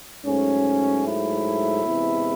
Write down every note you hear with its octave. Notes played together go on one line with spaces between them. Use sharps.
G#2 F#3 A3 C#4
E4
E2 C3 E3 G#3